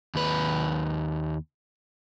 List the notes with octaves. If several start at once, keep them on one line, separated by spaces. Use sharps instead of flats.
D#2 B4